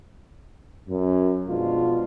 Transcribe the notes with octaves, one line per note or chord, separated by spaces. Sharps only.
F#2
B2 F3 G#3 D4 F4